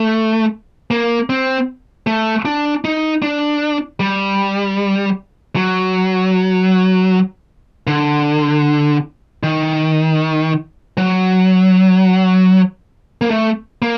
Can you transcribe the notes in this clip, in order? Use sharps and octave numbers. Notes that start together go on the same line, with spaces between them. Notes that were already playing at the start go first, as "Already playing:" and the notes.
Already playing: A3
A#3
C4
A3
D4
D#4
D4
G3
F#3
D3
D#3
F#3
A#3
A3
A#3